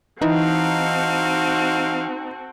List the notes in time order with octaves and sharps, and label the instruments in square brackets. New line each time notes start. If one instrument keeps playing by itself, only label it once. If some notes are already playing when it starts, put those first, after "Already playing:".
[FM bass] E3 [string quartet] C4 F#4 A4 [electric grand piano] D#4 [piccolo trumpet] F5